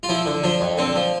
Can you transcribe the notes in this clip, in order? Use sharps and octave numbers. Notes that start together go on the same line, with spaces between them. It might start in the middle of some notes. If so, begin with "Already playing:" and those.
F4
F3 E4
D3
F3 D4
F2
D3 C4
F3